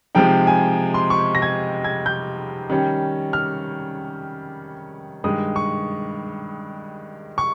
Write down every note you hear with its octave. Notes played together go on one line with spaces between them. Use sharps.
C3 F3 G#3 D#4 G5
G#5
C6
C#6
A#6
G#6
G#6
G6
D#3 G3 C#4
F6
G2 D#3 G#3 D#6
C#6
C#6